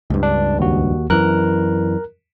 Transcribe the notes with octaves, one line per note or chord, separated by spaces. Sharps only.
C#2 G2
D4
D#2 F#4
F#2 E3 A#4 F#6